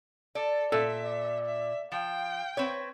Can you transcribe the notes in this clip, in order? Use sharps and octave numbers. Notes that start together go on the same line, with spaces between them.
A4 D5
A#2 A4 E5
D5
E5
F3 F5 G5
C4 B4 C#5